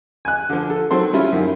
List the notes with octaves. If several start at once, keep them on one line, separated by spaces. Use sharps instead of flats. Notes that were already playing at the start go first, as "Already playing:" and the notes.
G#5 F#6
D3 F3
A4
D#3 F#3 C4 A4 C5
G3 C#4 E4 F4
F#2 D#3